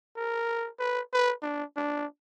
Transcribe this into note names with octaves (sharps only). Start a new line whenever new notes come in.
A#4
B4
B4
D4
D4